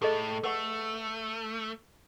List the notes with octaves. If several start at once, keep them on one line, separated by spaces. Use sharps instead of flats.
A2 G#4 A4 D#5
A3 B4 F#5 C#6